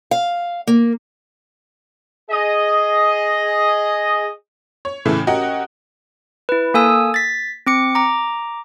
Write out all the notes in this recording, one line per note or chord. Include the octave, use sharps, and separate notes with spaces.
F5
A#3
G#4 D#5
C#5
A2 C#3 E3 A3 E4
C#4 F#4 G4 A#4 D#5 F#5
E4 B4
A#3 A4 G#5 D#6 E6
A6 B6
C4 D6 C#7
A#5 D6